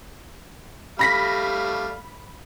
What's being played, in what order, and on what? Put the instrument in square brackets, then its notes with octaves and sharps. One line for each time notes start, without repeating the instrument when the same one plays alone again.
[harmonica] G3 A3 F5 [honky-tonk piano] B5 A#6 B6